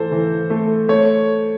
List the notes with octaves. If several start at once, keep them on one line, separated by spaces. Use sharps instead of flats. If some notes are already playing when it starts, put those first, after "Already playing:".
Already playing: E3 A3 A4 C5
E3
A3
A3 C#5